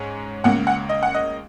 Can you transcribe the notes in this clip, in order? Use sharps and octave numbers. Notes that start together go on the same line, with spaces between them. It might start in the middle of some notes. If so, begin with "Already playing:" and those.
Already playing: G#2 G#3 C#4
C#2 C#3 A#3 F#5
F#5
D#5
F#5
D#5